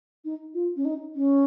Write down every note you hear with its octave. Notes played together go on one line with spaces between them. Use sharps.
D#4
F4
C#4
D#4
C#4